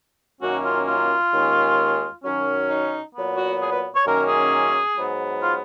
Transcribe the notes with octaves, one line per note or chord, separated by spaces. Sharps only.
F#2 D#3 A#3 C#4 F#4
F4
F4
D#2 D#3 G#3 C#4
F#2 D#3 F#3 C#4
D#4
A#2 F#3 B3
F#4
G#4
B4
C#5
F#2 D#3 A#3 C#4 A#4
G#4
G#2 F#3 B3
F4